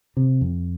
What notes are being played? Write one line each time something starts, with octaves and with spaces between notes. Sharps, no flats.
C3
F2